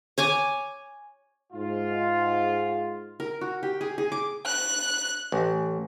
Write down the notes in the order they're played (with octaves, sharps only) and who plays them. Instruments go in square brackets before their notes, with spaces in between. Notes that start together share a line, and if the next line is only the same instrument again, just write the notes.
[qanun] C#5 G#5 D6
[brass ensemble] G#2 F4
[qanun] A#4
F#4
G4
G#4
G#4
D6
[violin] F#6
[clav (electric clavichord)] A1